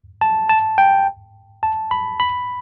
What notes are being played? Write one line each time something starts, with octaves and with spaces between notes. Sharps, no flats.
A5
A5
G5
A5
B5
B5